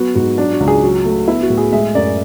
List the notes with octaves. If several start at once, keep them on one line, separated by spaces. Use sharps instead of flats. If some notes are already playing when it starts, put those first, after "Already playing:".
Already playing: F#3 B3 F#4
G#2 F#4
F#3 D4
F#4
C#2
G#4
F#3 F#4
A3
B3 E4
F#4
A2
G#4
G#3 E5
F#2 D5